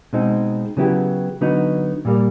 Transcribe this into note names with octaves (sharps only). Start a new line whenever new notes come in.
B2 G#3 C4 D#4
C#3 F#3 B3 E4 G4
D3 F#3 B3 D#4
A#2 G3 A#3